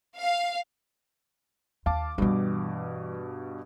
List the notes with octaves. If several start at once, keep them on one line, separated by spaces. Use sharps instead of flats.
F5
D#2 F5 A5 D6
G2 B2 E3 G3